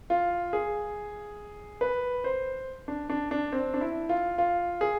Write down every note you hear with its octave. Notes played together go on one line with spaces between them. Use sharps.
F4
G#4
B4
C5
D4
D4
D4
C4
D4
E4
F4
F4
G#4